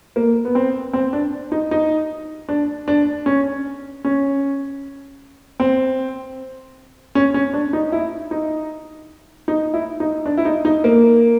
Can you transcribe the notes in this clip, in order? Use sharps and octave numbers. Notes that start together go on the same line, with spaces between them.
A#3
B3
C4
C4
D4
D#4
D#4
D4
D4
C#4
C#4
C4
C#4
C#4
D4
D#4
E4
D#4
D#4
E4
D#4
D4
E4
D#4
D#4
A#3